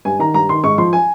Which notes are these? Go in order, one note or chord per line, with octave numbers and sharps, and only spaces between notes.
G2 G#5
D#3 A#5
G2 A#5
D#3 C6
G#2 C#6
F3 C6
G#5